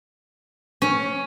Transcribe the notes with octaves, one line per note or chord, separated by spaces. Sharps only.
C#4